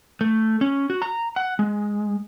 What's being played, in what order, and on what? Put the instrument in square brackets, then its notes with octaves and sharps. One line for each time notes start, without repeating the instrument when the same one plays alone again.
[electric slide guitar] A3
C#4
F#4
A#5
F#5
G#3